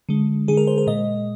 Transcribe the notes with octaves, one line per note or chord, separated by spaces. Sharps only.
D3 G#3
D3 G#3 G#4
A#4
C5
A#4
A#2 G#3 D#5